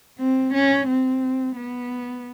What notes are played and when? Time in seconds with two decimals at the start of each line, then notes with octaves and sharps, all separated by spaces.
0.19 C4
0.54 C#4
0.88 C4
1.56 B3